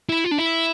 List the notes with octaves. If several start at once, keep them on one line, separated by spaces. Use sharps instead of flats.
E4
F4
D4
E4